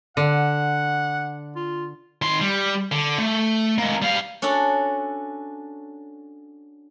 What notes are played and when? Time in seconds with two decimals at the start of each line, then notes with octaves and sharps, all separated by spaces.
0.17 D3 F#5
1.56 F4
2.22 D#3 C6
2.41 G3
2.92 D3
3.18 A3
3.78 G#3 A#3
4.02 G3 F5
4.42 C#4 D4 F#4 A4